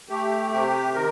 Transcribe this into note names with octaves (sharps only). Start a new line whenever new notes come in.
A3 G4
C3 G4
D#3 A#4